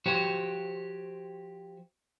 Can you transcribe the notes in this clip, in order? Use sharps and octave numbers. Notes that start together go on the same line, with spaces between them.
F3 F#4 G4 C5 C#5